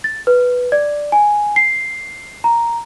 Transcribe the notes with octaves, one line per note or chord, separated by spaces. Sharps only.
A6
B4
D5
G#5
C7
A#5